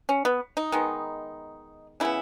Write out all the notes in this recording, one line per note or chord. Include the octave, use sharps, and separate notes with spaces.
C#4
B3
D#4
D#3 G#3 B3
C#3 E3 B3 E4